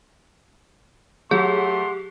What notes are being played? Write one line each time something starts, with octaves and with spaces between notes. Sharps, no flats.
F#3 A3 G4 G#4 F#5 C6